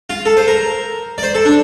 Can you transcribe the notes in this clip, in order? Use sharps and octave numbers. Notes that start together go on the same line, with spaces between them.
F4
A4
C5
A#4
D5
C5
A4
D4